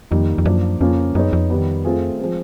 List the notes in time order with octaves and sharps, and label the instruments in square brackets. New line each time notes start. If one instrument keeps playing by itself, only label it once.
[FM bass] F2 [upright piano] D#3 G3 A#3 D#4
[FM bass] F2
[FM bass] F#2 [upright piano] F3 A#3 D4
[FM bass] F2 [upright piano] C#3 F3 A#3 C#4 F4
[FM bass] F#2 [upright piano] B3 D#4 G#4 C#5
[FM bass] F2
[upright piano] D#3 G3 B3
A3 C4 F4 G#4
F3 G#3 C4